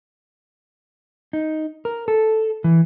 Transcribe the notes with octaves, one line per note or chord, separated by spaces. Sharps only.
D#4
A#4
A4
E3